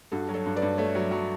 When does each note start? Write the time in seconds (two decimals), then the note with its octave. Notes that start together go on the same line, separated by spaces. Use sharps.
0.12 G2 F#4 A4
0.29 F#3
0.34 A4 C#5
0.45 G2
0.56 B4 D5
0.62 G2
0.78 A3 C#5 E5
0.95 F#3
1.11 F#3